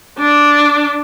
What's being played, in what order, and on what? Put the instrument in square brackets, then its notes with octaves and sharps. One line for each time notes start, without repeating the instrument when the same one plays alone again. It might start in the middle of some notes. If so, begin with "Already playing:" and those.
[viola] D4